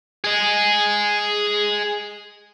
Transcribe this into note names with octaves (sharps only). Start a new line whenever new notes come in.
G#4 D#5